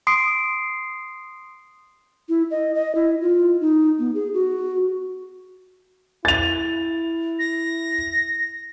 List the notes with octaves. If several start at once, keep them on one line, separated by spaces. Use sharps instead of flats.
C6 D#6 C7 D7
E4
D#5
D#5
E4
F4
D#4
B3
G#4
F#4
E4 A6 F7
A#6